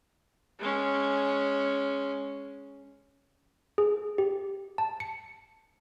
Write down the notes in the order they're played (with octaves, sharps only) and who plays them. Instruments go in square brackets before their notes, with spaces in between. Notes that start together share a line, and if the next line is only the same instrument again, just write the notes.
[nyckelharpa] G#3 C#4
[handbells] G#4
G4
A5
C#7